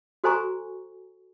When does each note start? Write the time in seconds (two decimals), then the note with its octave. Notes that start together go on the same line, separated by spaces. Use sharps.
0.24 F#4 A4 C5 G#5 A#5 C#6